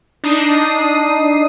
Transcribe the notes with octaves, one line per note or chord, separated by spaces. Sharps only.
D4 D#4 D#6 C7